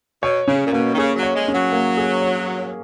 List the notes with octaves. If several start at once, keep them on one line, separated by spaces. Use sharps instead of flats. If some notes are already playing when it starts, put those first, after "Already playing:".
B2 C#5
C#3 C#4
A#2
B2 A#3
D#3
C#3 G#4
F#3
C#5
G#3
C#4
F#3
A#3
G#4
C#5